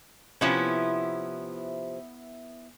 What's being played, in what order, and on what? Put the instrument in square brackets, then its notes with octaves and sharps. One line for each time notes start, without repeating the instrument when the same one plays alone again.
[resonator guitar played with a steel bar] C3 F3 C#4 [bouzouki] B3 E4 B4